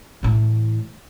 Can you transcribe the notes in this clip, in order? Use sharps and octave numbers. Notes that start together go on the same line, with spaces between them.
A2 E3